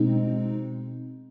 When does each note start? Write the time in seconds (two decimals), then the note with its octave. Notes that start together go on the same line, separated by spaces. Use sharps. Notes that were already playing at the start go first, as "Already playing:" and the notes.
Already playing: B2 G#3 C4 D#4